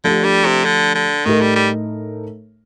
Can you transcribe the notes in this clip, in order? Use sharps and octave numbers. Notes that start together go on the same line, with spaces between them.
D3 F3 A3 D4 G4
G3
C3
D3
D3
A2 D#3 A3 D#4 A#4
G3
G3